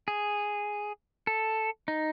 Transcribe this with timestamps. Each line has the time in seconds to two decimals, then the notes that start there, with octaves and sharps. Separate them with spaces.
0.08 G#4
1.27 A4
1.88 D#4